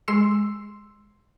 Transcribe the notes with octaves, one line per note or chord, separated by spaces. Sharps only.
G#3 C6 E6 C7